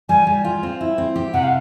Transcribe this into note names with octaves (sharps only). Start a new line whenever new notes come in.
G3 G#5
G3
F4
C4
E4
C4
G4
C3 F#5
F5